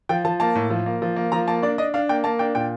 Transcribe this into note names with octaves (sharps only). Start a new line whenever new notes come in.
F3 G5
F3 A5
A#3 A5
A2
F3
A#3
F3
A#3
F3 A#5
A#3 A5
D4 D5
D4 D#5
D4 F5
A#3 G5
A#3 A5
D4 G5
A#2 G5